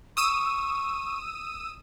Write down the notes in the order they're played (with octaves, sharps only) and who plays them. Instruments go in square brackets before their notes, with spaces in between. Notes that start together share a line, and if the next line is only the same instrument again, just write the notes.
[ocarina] C#6 [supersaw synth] D#6 E6 D#7